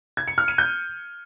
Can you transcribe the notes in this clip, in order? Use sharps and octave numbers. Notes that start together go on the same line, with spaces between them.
G#6
C#7
F6
D#7
G6